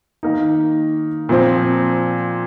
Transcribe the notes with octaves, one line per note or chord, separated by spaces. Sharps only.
D#3 A#3 D#4
A#2 F3 C4